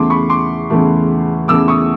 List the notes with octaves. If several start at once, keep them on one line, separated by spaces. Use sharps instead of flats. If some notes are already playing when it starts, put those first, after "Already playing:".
Already playing: E2 C#3 E3 A3 C6 D6
B5 C#6
C6 D6
E2 C#3 E3 A3
E2 C#3 E3 A3 D6 E6
C#6 D#6